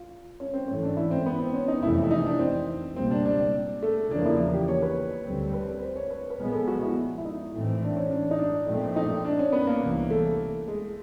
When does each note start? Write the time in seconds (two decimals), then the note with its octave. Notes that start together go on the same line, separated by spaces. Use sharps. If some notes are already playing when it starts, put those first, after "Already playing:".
Already playing: F4
0.40 C#4
0.54 C4
0.68 G#2 E3 A3 C#4
0.83 D4
0.97 E4
1.11 C4
1.26 B3
1.39 C4
1.54 C#4
1.68 D#4
1.83 F2 C3 E3 A3 E4
2.03 E4
2.11 D#4
2.26 D4
2.39 C4
2.96 C#2 B2 G3 A#3 C4
3.11 D4
3.26 D4
3.83 A3
4.11 E2 C#3 F3 A#3 D4
4.25 E4
4.54 G4
4.68 C#5
4.82 B4
5.24 D2 D3 G3 C4
5.53 B4
5.82 C5
5.96 C#5
6.10 B4
6.30 B4
6.39 A#2 F3 G#3 B3 A#4
6.53 A4
6.68 F#4
6.82 E4
7.18 E4
7.25 D#4
7.54 A2 E3 A3 C4
7.82 D4
7.97 C#4
8.10 D4
8.31 D#4
8.39 D4
8.67 A#2 F3 A3 C4
8.96 D#4
9.25 D4
9.39 C#4
9.52 B3
9.67 A#3
9.81 C2 C3 E3
10.10 A3
10.68 G#3